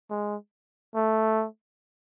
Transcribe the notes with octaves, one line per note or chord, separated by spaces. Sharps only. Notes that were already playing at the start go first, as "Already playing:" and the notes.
G#3
A3